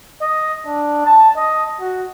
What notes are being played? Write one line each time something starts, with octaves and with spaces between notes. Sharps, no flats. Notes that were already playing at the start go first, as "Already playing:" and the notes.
D#5
D4
A5
D#5
F#4